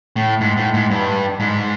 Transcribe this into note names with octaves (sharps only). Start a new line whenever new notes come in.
A2
G#2
A2
G#2
G2
G#2